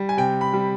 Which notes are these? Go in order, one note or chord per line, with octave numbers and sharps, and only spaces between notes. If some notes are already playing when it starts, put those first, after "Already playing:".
Already playing: G3
G#5
C3 G5
B5
G3